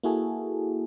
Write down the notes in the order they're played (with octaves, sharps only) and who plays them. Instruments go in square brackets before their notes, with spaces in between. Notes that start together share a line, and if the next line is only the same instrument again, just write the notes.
[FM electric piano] A#3 E4 F#4 G#4 A4